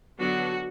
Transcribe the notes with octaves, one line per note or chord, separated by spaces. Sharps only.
D3 F#3 B3 D4 F#4